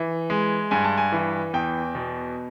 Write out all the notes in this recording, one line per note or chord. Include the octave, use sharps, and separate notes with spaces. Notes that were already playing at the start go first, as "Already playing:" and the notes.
Already playing: E3
G#3
G2 G#5
A5
G#5
E3
E2 G5
B2